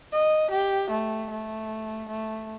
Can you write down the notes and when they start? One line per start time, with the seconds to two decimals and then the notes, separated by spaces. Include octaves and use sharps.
0.13 D#5
0.51 G4
0.90 A3
1.30 A3
2.09 A3